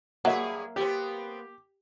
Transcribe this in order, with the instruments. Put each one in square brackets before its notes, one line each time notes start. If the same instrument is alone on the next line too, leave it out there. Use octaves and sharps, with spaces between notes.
[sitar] G2 G#4 [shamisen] F#3 [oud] A#3 E5
[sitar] B3 C4 [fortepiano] G4